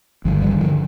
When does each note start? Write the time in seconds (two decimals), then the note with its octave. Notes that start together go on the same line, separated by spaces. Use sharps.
0.25 G1 G2 D3 F3
0.42 D#3 G3
0.61 D3 F3